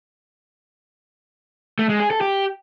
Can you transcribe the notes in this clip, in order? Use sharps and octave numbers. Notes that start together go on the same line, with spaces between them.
A3
G#3
G#4
A4
G4